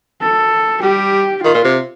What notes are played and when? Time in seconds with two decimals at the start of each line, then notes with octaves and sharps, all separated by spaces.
0.21 A4
0.82 G3 G4
1.43 D#3 F4
1.54 A#2
1.65 C3